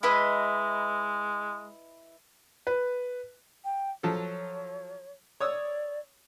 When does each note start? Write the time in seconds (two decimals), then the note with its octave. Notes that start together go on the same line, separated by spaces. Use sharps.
0.03 G#3 E4 B4 D#5
2.67 B4
3.65 G5
4.03 F3 F#3 A4 C#5
5.40 C#5 D5 D#6 E6